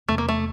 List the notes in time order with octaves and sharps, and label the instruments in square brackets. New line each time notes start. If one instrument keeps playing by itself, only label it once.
[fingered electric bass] E1 E2 C3 [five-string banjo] A3
[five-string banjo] A#3
A3